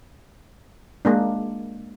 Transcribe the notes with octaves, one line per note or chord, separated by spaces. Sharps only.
G#3 A#3 D4